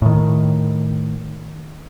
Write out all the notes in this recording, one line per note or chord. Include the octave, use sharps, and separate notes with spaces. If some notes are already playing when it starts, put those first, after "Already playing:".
A2 D#3